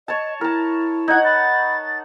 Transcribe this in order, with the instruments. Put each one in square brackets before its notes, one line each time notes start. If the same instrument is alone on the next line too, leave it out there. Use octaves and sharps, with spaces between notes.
[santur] C#5 A5 [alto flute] D#5
[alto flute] E4 [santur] A#4 A5
[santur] D#4 F#5 [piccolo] G#6
[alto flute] B5 [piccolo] A6